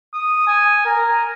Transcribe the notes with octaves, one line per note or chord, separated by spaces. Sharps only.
D#6
G#5
A#4